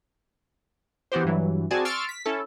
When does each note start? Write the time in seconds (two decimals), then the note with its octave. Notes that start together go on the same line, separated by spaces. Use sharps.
1.12 E3 B3 F#4 G4 C5
1.25 G2 E3 F#3
1.71 C4 F#4 G#4 D5 G#5 A5
1.85 C6 C#6 E6 F6 A6 D7
2.09 B6
2.26 C#4 E4 A4